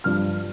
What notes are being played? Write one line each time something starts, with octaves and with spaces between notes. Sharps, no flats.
G2 F3 F6